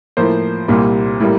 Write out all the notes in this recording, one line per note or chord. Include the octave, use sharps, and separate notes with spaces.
A2 F3 A#3 C5
C2 A#2 G3 A#3
A2 G3 A#3